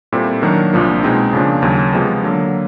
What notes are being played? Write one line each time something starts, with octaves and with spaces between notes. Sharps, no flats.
A#2 G3 C4 E4 A4
D#3 F#3 A#3 D4 F#4
C2 A#2 F3 A#3 D4
B2 G#3 C4 D#4
F2 C#3 F3 A#3 D4
D#2 C#3 F#3
C3 F3 G#3 B3
D3 F#3 A#3